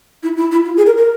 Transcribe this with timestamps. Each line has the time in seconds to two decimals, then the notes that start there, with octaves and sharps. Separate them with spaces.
0.23 E4
0.37 E4
0.51 E4
0.65 F4
0.77 G#4
0.86 A#4
0.97 A#4